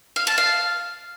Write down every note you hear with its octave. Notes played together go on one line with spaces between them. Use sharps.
F5
A5
F5